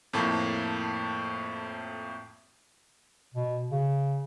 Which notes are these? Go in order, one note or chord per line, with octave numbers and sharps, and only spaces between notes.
F2 A2 A#3 A5
B2
C#3